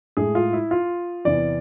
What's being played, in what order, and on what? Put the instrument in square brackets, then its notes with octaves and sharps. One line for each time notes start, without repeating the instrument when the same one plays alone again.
[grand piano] A2 G#3 G#4
F4
E4
F4
E2 C3 E3 D5